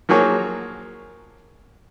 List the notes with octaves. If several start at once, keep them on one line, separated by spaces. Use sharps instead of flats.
F3 F#3 A#3 G#4 C#5